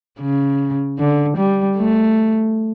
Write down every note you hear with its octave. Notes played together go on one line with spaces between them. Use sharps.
C#3
D3
G3
A3